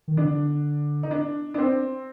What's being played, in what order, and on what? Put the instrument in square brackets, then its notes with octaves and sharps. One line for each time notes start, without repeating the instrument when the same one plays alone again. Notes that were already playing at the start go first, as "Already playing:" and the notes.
[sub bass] D#3
[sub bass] D3 [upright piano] D4
[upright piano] D#4
D4
D4
C4